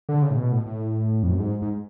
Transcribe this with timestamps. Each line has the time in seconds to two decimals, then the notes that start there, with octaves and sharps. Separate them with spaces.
0.09 D3
0.22 C#3
0.31 A2
0.37 B2
0.52 A2
0.67 A2
1.23 F2
1.31 F#2
1.39 G#2
1.62 G#2